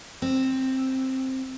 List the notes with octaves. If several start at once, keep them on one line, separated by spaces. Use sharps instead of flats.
C4